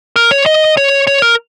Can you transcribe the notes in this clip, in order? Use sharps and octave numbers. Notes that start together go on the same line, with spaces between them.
A#4
C#5
D#5
C#5
C#5
A#4